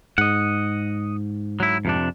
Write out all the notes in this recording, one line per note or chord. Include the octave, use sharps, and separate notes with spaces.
G#2 D#5 F#5
F#3 E4
F2 C3 D4